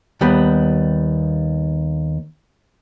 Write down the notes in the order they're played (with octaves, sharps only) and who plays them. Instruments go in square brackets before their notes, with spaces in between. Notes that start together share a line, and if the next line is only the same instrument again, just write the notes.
[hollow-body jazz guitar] D#2 G3 B3